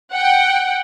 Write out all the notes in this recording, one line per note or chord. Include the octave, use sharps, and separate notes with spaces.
F#5 G5